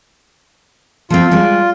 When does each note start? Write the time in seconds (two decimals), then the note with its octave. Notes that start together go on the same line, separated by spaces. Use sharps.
1.10 F3 A3 C4 F4
1.31 G3 G#3 D5